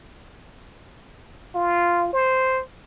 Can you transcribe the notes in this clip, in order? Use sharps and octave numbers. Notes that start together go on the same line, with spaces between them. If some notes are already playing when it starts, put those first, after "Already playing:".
F4
C5